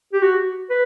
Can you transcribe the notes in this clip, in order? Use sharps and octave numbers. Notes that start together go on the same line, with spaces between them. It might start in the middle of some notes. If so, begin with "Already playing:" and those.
G4
F#4
B4